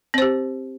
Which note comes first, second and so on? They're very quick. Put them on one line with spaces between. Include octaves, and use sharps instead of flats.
C4 C5 G4